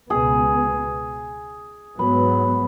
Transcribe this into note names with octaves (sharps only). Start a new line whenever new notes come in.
C#2 B2 B3 G#4
G#2 F#3 B3 B4